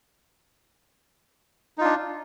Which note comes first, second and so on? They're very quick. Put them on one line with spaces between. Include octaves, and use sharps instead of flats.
D#4 F4 D4